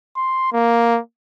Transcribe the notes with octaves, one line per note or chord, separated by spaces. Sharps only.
C6
A#3